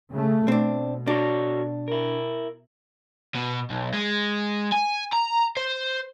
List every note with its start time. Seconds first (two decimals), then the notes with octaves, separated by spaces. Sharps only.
0.12 C#3 A3
0.48 B2 C4 D4
1.07 D4 F#4 A4 C#5
1.88 E4 A#4
3.35 B2
3.70 B1
3.94 G#3
4.72 G#5
5.13 A#5
5.57 C5